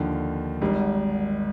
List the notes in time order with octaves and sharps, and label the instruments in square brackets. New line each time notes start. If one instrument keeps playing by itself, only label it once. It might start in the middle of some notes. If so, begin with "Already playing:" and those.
Already playing: [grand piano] D#2 D3 F3
G#1 G#2 G3